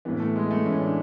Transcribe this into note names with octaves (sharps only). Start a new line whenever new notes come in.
A2 E3 B3
A3
G#3
A3
A2 E3 C#4
D4